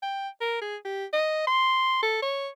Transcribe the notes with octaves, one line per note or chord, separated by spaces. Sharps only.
G5
A#4
G#4
G4
D#5
C6
A4
C#5